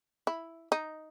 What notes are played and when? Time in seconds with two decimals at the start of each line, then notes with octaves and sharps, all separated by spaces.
0.27 E4
0.72 D#4